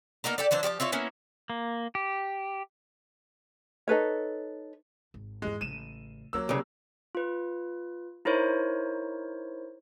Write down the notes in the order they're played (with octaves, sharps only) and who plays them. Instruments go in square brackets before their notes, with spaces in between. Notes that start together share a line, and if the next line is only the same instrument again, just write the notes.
[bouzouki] A#3 B3 D#4 A#4
G4 A4 D5
E3 F#3 D4 C5
F3 G4 D5 A5
C4 E4 F4 C#5
A#3 B3 C#4 E4
[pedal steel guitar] A#3
G4
[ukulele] D#4 A4 B4 C#5
[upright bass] G#1
[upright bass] E2 G#2 [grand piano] G#3
[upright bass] A1 C#3 [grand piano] D#7 E7
[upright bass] D2 [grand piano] F#3 A#3 E6
[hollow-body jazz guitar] C2 C#3
[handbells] F4 B4
D#4 E4 A#4 C5 C#5